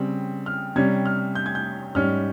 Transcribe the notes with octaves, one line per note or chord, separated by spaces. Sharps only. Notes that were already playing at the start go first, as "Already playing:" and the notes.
Already playing: C#3 G3 C4
F6
C3 G3 C#4 G#6
F6
G6
G#6
G6
G#2 G3 C#4 F6